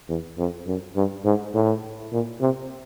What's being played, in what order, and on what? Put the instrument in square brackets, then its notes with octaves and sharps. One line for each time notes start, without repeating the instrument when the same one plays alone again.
[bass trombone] E2
F2
F#2
G2
G#2
A2
A#2
C3